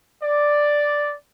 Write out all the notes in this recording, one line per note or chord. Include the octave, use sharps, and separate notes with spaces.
D5